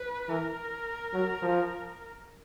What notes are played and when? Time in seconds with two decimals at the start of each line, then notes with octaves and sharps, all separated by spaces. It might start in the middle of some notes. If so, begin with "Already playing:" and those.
Already playing: B4
0.28 E3 A#4
1.14 F#3
1.42 F3